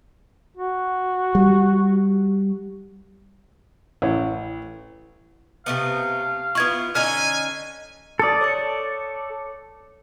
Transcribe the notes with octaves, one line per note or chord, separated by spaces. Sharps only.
F#4
G3
A1
C3 A3 B3 F5
B3 E4 F4 C#6 G#6
D3 C#4 D#4 G#5 F6
A4 D5 D#6 A6
C#5 D6 C#7